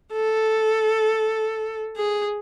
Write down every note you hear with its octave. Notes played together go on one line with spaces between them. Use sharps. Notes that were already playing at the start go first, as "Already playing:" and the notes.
A4
G#4